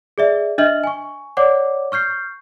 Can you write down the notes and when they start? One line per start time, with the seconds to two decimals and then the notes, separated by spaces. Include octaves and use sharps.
0.18 G#4 D5 E5
0.58 D4 D#5 E5 F6 F#7
0.84 G#5 C#6
1.37 C#5 D5 F#5 D6
1.92 C#6 F6 G6 C7